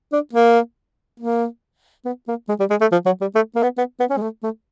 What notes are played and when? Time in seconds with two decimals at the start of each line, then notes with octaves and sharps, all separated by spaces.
0.12 D4
0.33 A#3
1.20 A#3
2.05 B3
2.28 A#3
2.48 G#3
2.59 G3
2.70 G#3
2.81 A3
2.92 F3
3.06 F#3
3.21 G3
3.35 A3
3.56 A#3
3.63 B3
3.78 B3
4.00 B3
4.10 C#4
4.17 G#3
4.21 A3
4.43 A3